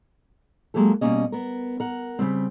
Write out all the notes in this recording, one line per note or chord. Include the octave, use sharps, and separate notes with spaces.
F#3 G#3 A#3 C4 G4 A4
B2 D3 G3 A#3 C#4 D#5
B3 A#4
A#4 F#5
C#3 G3 C4